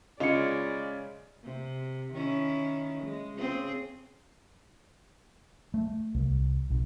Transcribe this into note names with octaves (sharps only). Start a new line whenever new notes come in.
C#3 G#3 C#4 F4 D5 D#5 F6 C#7
C3
D#3 C#4 E4
G#3
C#3 C4 G#4
A3
C2
B1